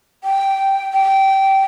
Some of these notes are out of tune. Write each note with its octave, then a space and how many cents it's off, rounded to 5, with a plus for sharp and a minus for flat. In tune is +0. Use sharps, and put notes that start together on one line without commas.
G5 -5
G5 -15